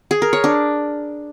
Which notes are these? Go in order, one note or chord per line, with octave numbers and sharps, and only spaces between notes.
G#4
A#4
C#5
D4